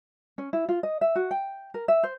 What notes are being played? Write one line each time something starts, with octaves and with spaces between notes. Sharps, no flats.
C#4
E4
F4
D#5
E5
F#4
G5
A#4
E5
C5